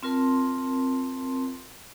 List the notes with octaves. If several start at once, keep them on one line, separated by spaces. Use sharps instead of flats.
C4 F4 A#4 A5 C6